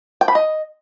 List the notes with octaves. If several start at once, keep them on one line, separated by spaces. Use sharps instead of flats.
G5
B5
D#5